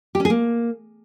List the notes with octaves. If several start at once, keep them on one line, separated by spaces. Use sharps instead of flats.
G4
C#4
G#4
A#3